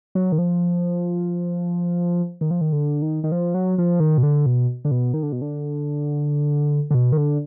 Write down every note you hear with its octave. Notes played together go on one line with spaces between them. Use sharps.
F#3
D#3
F3
D#3
F3
D#3
D3
D#3
D#3
F3
F#3
F3
D#3
B2
D3
B2
D3
B2
D#3
D3
B2
D3
D3
B2
D#3
D3